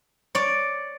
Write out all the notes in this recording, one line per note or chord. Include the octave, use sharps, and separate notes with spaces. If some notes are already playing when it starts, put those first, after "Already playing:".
C#5 D5